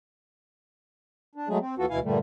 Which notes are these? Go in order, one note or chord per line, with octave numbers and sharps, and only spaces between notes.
D4
F#3 G#3 A3 G#4
C4
D#2 E3 F4 F#4 A4
D2 B2 E3 E4 F5 G#5
G2 A#2 D3 G3 A3